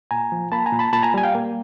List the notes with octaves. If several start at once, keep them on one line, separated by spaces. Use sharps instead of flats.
A#2 G#5 A#5
F3
A#3 A5 B5
G#5 A#5
A#2
A5 B5
A#2 A5 B5
G#5 A#5
G3 G#5
F5 G5
A#3